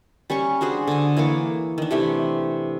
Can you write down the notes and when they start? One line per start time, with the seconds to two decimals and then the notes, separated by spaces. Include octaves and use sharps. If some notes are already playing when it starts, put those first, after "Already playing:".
0.30 G3 C#4 C#5 C#6
0.61 D4 F#4 G#4 C5
0.87 D3 G#5
1.17 E3 A#3 C#5 D6
1.78 D#3 D4
1.91 C3 E3 A3 G4